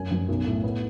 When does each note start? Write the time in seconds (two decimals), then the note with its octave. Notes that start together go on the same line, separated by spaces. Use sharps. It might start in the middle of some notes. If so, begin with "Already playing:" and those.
Already playing: F#2 G#5
0.11 F#2
0.28 B1
0.46 A2
0.64 B3